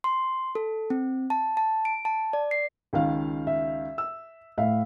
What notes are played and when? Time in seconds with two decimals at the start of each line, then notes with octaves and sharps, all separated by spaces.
0.04 C6
0.55 A4
0.90 C4
1.30 A5
1.57 A5
1.85 D7
2.05 A5
2.33 D5
2.51 C7
2.93 C#2 D#3 F5
3.47 E5
3.98 E6
4.58 A2 E5 F5